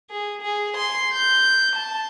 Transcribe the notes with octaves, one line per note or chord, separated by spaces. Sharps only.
G#4
G#4
C6
G6
A5